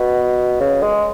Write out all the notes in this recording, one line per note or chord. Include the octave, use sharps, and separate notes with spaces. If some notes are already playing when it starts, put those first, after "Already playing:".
Already playing: B2
C#3
G#3